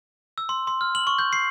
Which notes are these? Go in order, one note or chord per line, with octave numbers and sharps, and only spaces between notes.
E6
C6
C6
F6
F#7
C#6
G6
C7